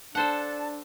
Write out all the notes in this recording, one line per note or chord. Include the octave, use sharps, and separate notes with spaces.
D4 A4 C5 F#5 A5